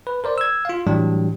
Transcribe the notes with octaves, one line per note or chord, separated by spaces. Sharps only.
B4
A#4 C5 D5
E6 G#6
F4 F5
A2 E3 F#3 G3 D4 G4